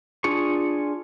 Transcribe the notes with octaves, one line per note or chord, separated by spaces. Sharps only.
D4 F4 G#4 C#6